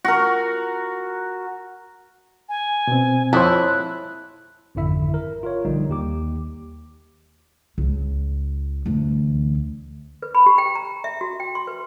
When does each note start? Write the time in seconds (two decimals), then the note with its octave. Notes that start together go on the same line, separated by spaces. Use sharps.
0.05 F#4 A#4
2.49 G#5
2.87 B2 C4
3.33 F2 E4 C5 C#5 A5 F#6
4.75 G#1 F2 D3 E4 E5
5.14 A#4
5.43 F4 A#4 C#5
5.65 A#1 D3 G3 D#4
5.89 D#2 G4 D6
7.78 C#2
8.86 D2 E3
10.22 B4
10.35 B5
10.46 G4
10.58 G5
10.75 A#5
11.04 E5
11.21 F#4
11.40 G5
11.55 C6
11.67 B4